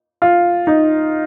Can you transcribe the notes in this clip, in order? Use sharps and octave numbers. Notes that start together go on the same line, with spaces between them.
F4
D#4